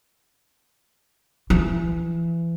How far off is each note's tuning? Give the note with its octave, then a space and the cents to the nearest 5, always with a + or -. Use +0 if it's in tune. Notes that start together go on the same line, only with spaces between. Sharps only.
E3 +30